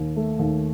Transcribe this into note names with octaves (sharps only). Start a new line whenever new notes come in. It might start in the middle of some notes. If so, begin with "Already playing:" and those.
Already playing: D#2
A3
D#2